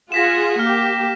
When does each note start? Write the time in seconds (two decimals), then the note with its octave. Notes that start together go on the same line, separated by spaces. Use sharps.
0.12 F4 G#4 F#5 A#6 B6 E7
0.59 A#3 G4 F6